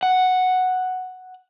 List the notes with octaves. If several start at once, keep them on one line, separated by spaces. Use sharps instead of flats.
F#5